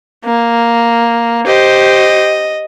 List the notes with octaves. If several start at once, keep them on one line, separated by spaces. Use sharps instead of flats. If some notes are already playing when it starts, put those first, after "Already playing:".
A#3
G4 C5 D#5